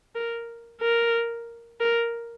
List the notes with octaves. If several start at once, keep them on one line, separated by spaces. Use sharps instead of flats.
A#4
A#4
A#4